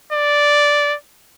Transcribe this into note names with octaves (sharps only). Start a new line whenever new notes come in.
D5